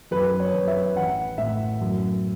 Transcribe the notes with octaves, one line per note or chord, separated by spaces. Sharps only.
F#2 B4
C#5
F#2
E5
A1 F#5
A2 E5
F#2